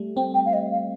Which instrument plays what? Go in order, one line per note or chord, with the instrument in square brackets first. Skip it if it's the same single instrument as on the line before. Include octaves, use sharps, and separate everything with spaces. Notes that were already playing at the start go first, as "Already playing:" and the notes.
Already playing: [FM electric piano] G3 A3
[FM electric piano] C4 [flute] G5
[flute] G5
F5
D#5
F5